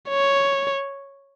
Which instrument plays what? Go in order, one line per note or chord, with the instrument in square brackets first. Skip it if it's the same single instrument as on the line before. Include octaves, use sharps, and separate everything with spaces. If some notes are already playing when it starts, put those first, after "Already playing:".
[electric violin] C#5